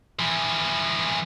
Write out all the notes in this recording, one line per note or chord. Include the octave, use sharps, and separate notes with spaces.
E3 F3